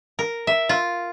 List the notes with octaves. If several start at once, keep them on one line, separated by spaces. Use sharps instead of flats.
A#4
E5
F4